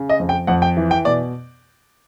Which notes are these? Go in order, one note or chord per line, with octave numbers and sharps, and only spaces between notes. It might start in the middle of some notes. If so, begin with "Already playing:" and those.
Already playing: C#3
D#5
F2
G5
F2 F#5
G5
E3
G5
B2 D5